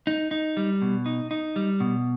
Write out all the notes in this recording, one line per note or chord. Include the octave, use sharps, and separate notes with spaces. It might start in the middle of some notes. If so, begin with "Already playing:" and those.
D#4
D#4
G3
B2
D#4
D#4
G3
B2